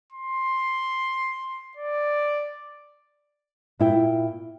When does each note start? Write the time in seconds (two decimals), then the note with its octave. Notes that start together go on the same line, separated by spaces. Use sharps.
0.12 C6
1.77 D5
3.79 A#2 E4 G5